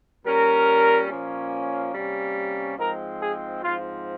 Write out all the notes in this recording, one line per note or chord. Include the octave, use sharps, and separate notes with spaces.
A#2 G3 C#4 A#4
A#2 F3 A#3 C#4
C3 G3 A#3 C#4
G#2 F3 G#3 C4 A#4
G#4
G#2 F3 C4 F4